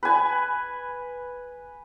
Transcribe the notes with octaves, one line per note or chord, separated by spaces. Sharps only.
B4 G#5